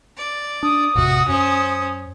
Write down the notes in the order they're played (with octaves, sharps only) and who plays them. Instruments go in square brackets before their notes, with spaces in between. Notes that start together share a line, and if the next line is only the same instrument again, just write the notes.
[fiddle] D5
[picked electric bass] D4 [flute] D#6
[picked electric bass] A1 F2 C3 [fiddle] F#4
[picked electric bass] F#2 [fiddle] C#4 C5